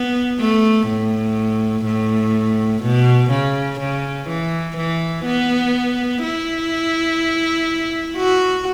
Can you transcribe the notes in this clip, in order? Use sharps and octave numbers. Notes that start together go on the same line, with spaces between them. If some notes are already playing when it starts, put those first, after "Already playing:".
Already playing: B3
A3
A2
A2
B2
C#3
C#3
E3
E3
B3
E4
F#4